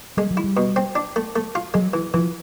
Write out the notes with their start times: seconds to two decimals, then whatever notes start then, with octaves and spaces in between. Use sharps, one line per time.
0.17 G3 G#3
0.31 F#3
0.37 E4
0.44 G3
0.57 B2
0.76 C4
0.95 D4
1.16 A3
1.36 A3
1.55 F4
1.74 F#3 G#3
1.93 E3
2.14 E3 F3